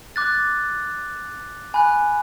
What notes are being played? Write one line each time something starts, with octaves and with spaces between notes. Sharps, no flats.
D6 F#6 A6
G#5 B5 F#6